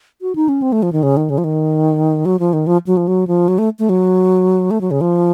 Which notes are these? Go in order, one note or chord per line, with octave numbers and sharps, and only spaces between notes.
F#4
D#4
C#4
C4
A3
F3
D#3
C#3
D#3
C#3
F3
D#3
F#3
F3
D#3
F3
F#3
F3
F#3
F3
F#3
A3
A3
F#3
A3
F#3
C#3
F3